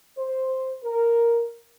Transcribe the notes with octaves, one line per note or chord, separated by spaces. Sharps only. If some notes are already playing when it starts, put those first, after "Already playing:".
C5
A#4